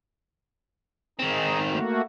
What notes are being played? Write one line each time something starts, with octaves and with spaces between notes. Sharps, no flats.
D#3 C4 D#4 G#4
A3 A#3 F#4